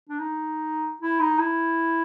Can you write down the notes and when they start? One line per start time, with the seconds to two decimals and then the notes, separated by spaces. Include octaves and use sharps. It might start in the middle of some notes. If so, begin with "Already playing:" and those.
0.09 D4
0.19 D#4
1.02 E4
1.20 D#4
1.39 E4